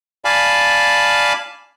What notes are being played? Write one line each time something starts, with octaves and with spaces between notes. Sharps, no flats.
D5 F5 G#5 A5 B5